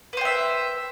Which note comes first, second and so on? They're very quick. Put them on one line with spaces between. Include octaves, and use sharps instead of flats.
B4 C5 G5 E5